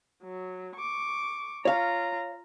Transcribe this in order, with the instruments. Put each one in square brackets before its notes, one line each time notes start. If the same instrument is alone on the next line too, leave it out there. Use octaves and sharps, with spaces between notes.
[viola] F#3
C#6 D6
[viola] F4 A#5 [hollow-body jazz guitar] C#5 F5